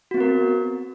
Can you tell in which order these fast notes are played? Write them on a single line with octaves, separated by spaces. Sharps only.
F#4 B3 C4 A#4